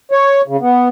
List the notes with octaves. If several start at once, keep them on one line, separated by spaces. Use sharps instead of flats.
C#5
C#3
B3